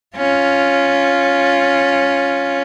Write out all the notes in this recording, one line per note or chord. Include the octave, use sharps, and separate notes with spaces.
C#4 F4